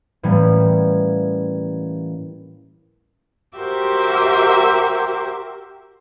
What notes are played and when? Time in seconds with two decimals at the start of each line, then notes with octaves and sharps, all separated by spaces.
0.23 A2 E3 G3 A#3 C#4
3.58 F#4 G4 A#4 C5 E5 D6